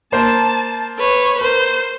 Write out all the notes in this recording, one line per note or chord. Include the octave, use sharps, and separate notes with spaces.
A#3 C5 A5
B4 C#5
A#4 C5